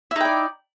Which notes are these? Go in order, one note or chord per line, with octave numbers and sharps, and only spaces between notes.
D#4 E4 D5 G5